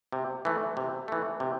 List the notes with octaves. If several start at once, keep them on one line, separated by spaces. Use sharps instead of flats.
C3
E3 A3
C3
E3 A3
C3